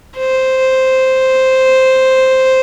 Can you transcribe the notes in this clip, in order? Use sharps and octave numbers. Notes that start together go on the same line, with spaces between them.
C5